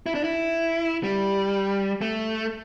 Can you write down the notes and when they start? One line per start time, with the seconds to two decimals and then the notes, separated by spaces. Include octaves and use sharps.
0.06 E4
0.15 D4
0.24 E4
1.04 G3
2.01 A3